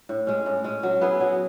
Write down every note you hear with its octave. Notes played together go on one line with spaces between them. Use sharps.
A2
G#3 C#4
A2
G#3 C#4
F#3
B3 E4 G#4
F#3